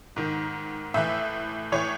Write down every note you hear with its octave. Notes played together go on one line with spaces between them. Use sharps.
G#2 D#3
A2 E3 E5
A2 E3 C#5